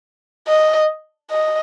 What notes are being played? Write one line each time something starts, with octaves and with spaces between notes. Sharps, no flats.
D#5
D#5